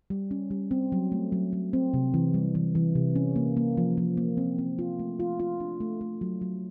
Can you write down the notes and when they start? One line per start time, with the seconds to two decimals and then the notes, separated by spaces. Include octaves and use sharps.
0.10 G3
0.31 C#4
0.51 G3
0.71 C4
0.92 F#3
1.12 A3
1.32 F#3
1.53 F#3
1.73 C4
1.94 C3
2.14 E3
2.34 G3
2.55 E3
2.75 E3
2.95 C3
3.16 C#4
3.36 A#3
3.57 A#3
3.77 F3
3.97 F3
4.17 A#3
4.37 C4
4.59 C4
4.79 F4
4.99 A3
5.20 F4
5.40 F4
5.60 D4
5.81 A3
6.01 A3
6.21 F#3
6.42 F#3